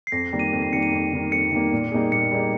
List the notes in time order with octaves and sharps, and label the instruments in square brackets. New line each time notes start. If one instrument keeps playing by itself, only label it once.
[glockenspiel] C7
[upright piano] F2 [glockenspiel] A#6
[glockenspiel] C7
[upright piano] D#3 G3 A#3
[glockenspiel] D#7
[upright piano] F2
[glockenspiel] C7
[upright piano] D#3 G3 A#3 [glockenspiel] C#7
[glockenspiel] D#7
[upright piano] F2
D#3 G3 A#3
[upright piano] F2 [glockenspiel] C#7
[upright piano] D#3 G3 A#3
A#2
G3 A#3 D#4 G#4
[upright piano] A#2 [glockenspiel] C#7
[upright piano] G3 A#3 D#4 G#4